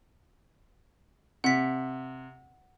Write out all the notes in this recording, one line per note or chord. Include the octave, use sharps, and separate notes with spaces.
C3 F#5 B6